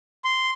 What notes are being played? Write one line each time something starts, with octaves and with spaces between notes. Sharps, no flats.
C6